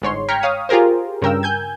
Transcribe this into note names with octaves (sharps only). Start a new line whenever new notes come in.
G1 G#2 C#5 C6
G5 A#5 F6 G#6 B6 C#7
C#5 F5 D#6
F4 G4 G#4 A#4 C5
G2 C#3 A#4 G5 E6
G#5 G6 G#6